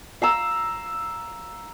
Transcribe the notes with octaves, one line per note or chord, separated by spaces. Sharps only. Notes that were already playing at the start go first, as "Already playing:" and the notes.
F5 A#5 E6